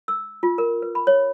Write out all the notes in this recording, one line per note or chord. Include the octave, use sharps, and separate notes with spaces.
E6
F4
A#4
B4
B5
C#5